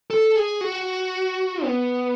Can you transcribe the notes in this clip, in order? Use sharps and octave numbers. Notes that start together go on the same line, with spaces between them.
A4
G#4
F#4
B3